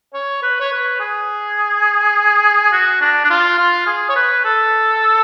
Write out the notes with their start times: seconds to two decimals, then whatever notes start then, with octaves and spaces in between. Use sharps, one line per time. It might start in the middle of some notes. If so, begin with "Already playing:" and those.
0.14 C#5
0.43 B4
0.60 C#5
0.72 B4
1.00 G#4
2.72 F#4
3.01 D4
3.25 D4
3.30 F4
3.59 F4
3.87 G#4
4.09 C#5
4.16 B4
4.45 A4